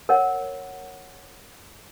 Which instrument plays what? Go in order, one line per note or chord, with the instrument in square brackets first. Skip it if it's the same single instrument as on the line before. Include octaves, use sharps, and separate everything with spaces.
[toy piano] A#4 C#5 F#5